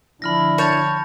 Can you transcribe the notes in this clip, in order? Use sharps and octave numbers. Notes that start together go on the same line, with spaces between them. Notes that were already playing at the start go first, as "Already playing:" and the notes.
D3 F3 D4 E4 B5 F6 A#6
C#5 A5 G6 A6